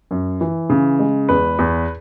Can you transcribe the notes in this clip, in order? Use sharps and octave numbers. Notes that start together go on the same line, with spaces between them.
F#2
E3
C#3
G#3
E2 B4
E2